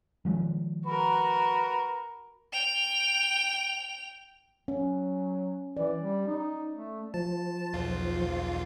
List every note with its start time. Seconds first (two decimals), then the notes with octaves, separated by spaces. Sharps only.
0.25 D#3 F3 G#3
0.86 F#4 A#4 B4
2.53 G5 F7
4.68 F#3 C#4
5.77 E3 D5
5.99 G3
6.27 D#4
6.73 A3
7.14 F3 A5
7.73 B1 E2 F4